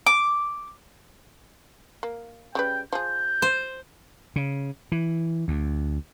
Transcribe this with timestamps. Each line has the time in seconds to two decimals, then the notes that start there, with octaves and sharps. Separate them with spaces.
0.06 D6
2.03 A#3
2.55 C#3 G3 B4 G5
2.93 F3 G#4 G6
3.42 C5
4.36 C#3
4.92 E3
5.48 D2